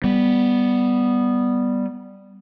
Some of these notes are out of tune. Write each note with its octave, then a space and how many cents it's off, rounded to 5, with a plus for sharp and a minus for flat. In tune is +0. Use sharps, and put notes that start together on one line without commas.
G3 +0 B3 +0